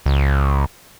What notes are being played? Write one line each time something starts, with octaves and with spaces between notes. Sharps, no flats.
C#2